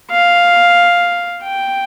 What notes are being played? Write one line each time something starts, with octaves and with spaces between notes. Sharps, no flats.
F5
G5